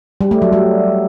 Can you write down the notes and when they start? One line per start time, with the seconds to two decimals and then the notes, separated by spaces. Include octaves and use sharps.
0.21 G3
0.31 A3
0.42 F#3
0.52 G3